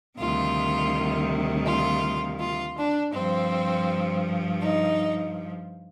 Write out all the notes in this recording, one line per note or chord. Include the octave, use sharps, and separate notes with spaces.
D2 C3 D#3 G3 F4
F4
F4
D4
G2 F3 C4
D#4